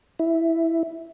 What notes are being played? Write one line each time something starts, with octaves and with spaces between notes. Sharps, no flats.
E4